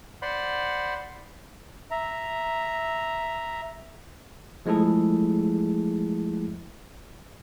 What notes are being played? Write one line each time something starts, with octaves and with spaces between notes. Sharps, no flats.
C5 D5 F#5 B5 C6
E5 A#5
F3 G#3 A3 E4 G#4 A4